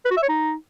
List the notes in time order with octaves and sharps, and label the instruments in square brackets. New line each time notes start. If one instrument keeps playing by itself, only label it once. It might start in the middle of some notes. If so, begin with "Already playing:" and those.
[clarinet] B4
F#4
E5
C#5
D#4